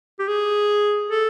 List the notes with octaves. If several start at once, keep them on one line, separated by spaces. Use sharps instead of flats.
G4
G#4
A4